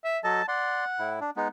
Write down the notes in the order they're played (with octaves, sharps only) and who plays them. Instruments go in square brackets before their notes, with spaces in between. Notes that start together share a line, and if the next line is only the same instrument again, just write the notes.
[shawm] E5
[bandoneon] F#3 A4 D#5 [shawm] A5
[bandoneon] D5 C6 [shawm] F#5
[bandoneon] A2 E4
D4
G#3 B3 D#4